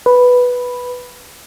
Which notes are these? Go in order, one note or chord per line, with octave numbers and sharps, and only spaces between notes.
B4